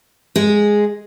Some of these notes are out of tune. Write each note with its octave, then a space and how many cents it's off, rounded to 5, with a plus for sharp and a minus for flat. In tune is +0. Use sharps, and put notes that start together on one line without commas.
G#3 +0 G#4 +0